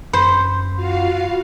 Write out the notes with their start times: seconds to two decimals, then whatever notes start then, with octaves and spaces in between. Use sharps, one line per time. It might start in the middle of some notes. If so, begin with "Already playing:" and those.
0.13 F#2 C5 B5
0.76 F4 F#4 F5